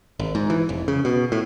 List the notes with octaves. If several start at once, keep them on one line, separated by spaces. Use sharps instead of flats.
G#1
G#2
E3
F1
C#3
B2
A2